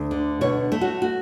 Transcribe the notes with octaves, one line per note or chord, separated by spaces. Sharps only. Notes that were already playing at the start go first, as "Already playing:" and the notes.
Already playing: D2
D3
B2 C#5
A3
F#4
F#4